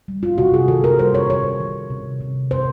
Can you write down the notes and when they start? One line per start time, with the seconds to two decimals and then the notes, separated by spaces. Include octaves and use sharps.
0.08 G3
0.23 F4
0.38 C3 F#4
0.54 G#4
0.68 D#3 A4
0.84 A#4
0.99 G3 C5
1.15 C#5
1.30 D#3 C#5
1.60 D#3
1.90 C3
2.21 C3
2.51 C3 C5